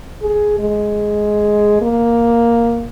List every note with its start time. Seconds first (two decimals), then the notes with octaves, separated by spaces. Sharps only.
0.22 G#4
0.59 G#3
1.82 A#3